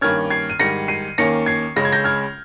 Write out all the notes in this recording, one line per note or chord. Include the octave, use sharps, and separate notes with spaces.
G2 D#3 A#3 C#4 F6 G#6
G#6 C7
D#7
G#2 D#3 G3 A#6 C#7
C7 D#7
D#2 D#3 A#3 C#4 A#6 C#7
G#6 C7
C#2 C#3 G#3 C#4 A#6
G#6
G6 A#6
F6 G#6